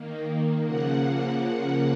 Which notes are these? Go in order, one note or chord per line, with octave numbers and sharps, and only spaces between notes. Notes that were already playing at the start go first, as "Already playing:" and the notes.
Already playing: D#3 A#3
C#3 F3 A#3 F#5